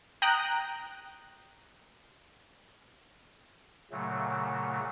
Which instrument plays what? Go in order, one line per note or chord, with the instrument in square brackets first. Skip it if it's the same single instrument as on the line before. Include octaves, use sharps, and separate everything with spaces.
[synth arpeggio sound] G5 A#5 D#6 F#6
[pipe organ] A#2 C#3 F#3 A3